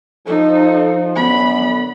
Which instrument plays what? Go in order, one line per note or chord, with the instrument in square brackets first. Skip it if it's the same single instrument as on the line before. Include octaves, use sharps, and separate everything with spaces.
[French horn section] F3 [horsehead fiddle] D#4 [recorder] A4
[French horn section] F#2 D3 [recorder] B3 [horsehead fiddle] B5